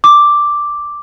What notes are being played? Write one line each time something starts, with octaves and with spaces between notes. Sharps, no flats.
D6